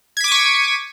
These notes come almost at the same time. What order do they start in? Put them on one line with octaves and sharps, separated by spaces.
G#6 B6 D6 D#7 C#6